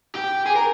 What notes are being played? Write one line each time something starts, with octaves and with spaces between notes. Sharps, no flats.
G4
G#4
A#4